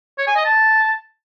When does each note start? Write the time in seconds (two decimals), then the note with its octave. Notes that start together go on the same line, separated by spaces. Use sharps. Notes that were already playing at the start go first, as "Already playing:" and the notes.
0.18 C#5
0.27 G#5
0.36 D#5
0.45 A5